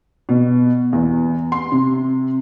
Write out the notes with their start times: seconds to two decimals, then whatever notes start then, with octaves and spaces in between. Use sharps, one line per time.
0.29 B2
0.93 E2
1.52 C6
1.72 C3